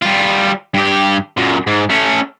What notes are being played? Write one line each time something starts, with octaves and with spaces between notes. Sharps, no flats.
G3 F4
G2 G4
F#2 A#2
G#2
A3 C#4